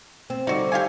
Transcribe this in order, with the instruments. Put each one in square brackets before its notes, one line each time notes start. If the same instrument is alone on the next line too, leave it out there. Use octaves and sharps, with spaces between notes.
[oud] C4
[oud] D3 G3 [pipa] D#4 F#4
[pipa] G4 F5 G#5